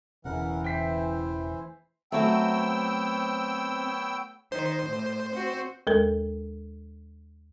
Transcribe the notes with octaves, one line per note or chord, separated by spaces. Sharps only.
E1 C#3 E3 A#4 F#5
E4 C5 G5 B6 C7
F#3 A3 B3 C4 C#5 G5 E6
D#3 C5
A2
C4 F#4
D#2 G#3 A4 A#4